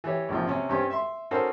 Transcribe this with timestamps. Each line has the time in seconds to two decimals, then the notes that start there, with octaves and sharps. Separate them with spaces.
0.04 E3 G4 C#5
0.29 A#1 G#2 C3 F3
0.48 C3 C#4
0.69 G2 C4 C#4 G4 C#5
0.90 E5 C6
1.31 C#4 D#4 F#4 A4 A#4 C5